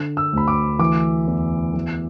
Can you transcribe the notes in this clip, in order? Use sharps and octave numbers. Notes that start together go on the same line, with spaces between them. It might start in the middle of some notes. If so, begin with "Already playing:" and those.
Already playing: D3
E6
D2 B5
D6
E3 D6
E2
E3